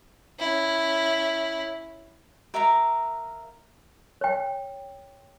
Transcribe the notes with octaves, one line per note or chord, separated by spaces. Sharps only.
C#4 E4
A#4 E5 F5 A#5
C#5 G5